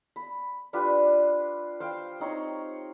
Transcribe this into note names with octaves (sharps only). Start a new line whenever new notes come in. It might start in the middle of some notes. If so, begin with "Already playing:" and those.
B5
D4 F4 G4 B4
C5 F5 G5
C4 D#4 C#5 A#5